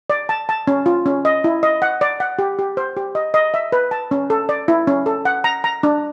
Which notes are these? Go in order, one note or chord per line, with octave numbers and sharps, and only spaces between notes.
D5
A5
A5
C#4
F4
C#4
D#5
E4
D#5
F#5
D5
F#5
G4
G4
C5
G4
D#5
D#5
E5
B4
A5
C#4
A4
D5
E4
C#4
A4
F#5
A#5
A#5
D4